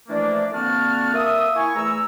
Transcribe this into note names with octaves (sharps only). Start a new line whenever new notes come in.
E3 F3 A3 A#3 D4
D3 A#3 C4 F#4 A5 F6
A#3 E5 D#6
E4 G#5 C#6
E2 A3 A#5 E6